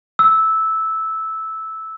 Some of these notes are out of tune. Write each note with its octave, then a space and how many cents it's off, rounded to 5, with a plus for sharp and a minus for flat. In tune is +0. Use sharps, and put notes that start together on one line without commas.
E6 -10